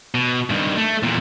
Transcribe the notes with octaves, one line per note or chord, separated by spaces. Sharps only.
B2
G2 D#3
A3
E2 A#2